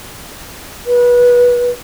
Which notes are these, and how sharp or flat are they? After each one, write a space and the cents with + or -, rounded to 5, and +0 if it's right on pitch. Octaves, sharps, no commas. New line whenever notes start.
B4 -25